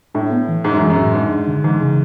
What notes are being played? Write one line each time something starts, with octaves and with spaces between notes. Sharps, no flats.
A2 D4
B3
E3
G#2 G#3
F#2
G#2 E3
F#2
A2
G#2 D4
G#3
D3
G#2 E3
C#3